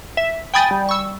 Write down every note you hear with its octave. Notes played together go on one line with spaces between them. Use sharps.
E5
G5 G#5 B5 D#6 G6 A6
G3
C#6 E6